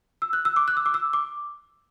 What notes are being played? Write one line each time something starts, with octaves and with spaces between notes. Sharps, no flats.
E6
F#6
E6
D6
F#6
E6
D6
E6
D6